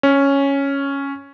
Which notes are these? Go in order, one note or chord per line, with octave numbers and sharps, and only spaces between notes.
C#4